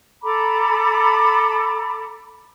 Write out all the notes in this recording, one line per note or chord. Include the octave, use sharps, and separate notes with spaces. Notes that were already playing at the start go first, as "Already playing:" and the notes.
A4 A#5 B5 D6